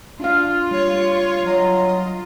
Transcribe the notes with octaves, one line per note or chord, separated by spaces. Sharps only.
D4 F4 F5
G3 C#5
F#3 D#5